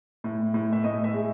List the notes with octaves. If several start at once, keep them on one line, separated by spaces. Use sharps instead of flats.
A2
A2
E5
A2 D#5
E5
G#3